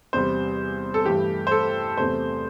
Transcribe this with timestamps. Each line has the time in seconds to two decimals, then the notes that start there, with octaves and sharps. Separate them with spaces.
0.13 E2 C3 G3 C5
0.94 A4
1.05 G2 E3 A3 G4
1.47 C5
1.51 A4
1.97 E2 C3 A3 C5